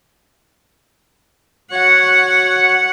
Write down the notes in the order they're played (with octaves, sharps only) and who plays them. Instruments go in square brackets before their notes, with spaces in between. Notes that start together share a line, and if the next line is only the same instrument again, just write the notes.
[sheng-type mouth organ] F#4 C#5 C#6 [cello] F#5